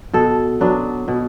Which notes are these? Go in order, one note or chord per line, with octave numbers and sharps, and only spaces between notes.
B2 A4
F#3 B3 D4
B2